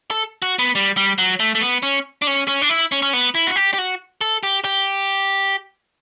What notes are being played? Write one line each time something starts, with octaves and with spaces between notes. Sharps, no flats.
A4
F#4
B3
G3
G3
F#3
A3
A3
B3
C#4
D4
C#4
C#4
D4
E4
C#4
C#4
B3
E4
F#4
G4
G4
F#4
A4
G4
G4